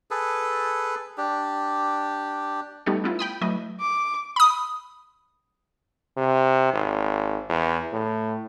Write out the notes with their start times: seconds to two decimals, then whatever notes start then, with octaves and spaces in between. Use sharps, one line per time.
0.11 G#4 A4 B4
1.18 D4 G4
2.86 G3 A3 B3 D#4 G4 A4
3.04 B3 C#4 E4 F4
3.19 G5 B5 D#6
3.41 F#3 A3 E4 B4 D#5
3.81 D6
4.36 B5 D#6
6.17 C3
6.73 G#1
7.50 E2
7.93 A2